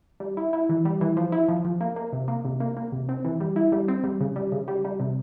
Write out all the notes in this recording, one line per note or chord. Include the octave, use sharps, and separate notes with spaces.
G3
E4
E4
E3
G3
E3
F3
E4
F3
F3
A#3
A#3
C3
A#3
C3
A#3
A#3
C3
C4
E3
G3
E4
G3
C4
G3
C#3
G3
C#3
G3
G3
C3